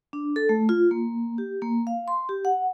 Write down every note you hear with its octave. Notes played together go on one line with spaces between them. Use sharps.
D4
A4
A3
F4
A#3
G4
A#3
F5
C6
G4
F#5